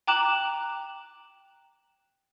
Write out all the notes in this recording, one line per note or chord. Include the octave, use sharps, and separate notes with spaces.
G5 A#5 D6 F#6 E7 F#7